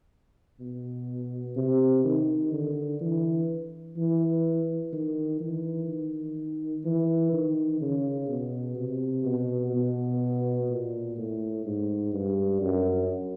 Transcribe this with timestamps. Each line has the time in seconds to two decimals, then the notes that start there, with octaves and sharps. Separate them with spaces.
0.60 B2
1.57 C3
2.05 D#3
2.53 D3
3.01 E3
3.97 E3
4.93 D#3
5.40 E3
5.89 D#3
6.85 E3
7.33 D#3
7.81 C#3
8.29 B2
8.77 C3
9.25 B2
9.73 B2
10.70 A#2
11.18 A2
11.66 G#2
12.14 G2
12.61 F#2